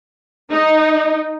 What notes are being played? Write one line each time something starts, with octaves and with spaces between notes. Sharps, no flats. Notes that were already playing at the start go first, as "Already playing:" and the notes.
D#4